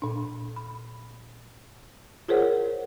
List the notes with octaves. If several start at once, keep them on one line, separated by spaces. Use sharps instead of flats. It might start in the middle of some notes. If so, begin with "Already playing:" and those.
A#2 D4
B5
F4 G#4 A#4 C5 C#5 F#5